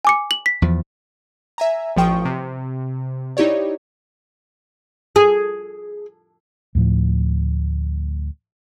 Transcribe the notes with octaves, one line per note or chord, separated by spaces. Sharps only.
G#5 D6 C#7
F#7
B6
E2 F3
E5 G#5 A#5
A1 F3 G5 C#6 D#6
C3
D#4 E4 G4 C#5 D5
G#4
D2 A2 F3